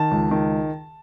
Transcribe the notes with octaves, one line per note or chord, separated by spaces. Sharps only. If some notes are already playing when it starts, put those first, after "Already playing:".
Already playing: D#3 A5
C#2
D#3